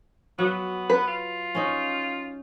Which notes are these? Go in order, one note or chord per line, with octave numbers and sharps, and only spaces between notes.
F#3 B3
B4
F4
C#4 D#4